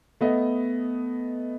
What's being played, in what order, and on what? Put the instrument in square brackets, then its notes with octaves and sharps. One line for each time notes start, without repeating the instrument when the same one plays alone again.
[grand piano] A3 B3 D#5